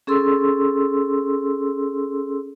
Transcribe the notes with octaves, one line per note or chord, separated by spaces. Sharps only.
C#4 G#4 A4 C6 E6